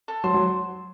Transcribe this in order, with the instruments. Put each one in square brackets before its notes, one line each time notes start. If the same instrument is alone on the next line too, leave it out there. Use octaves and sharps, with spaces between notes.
[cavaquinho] A4
[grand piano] F#3 [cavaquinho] C5
[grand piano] F#3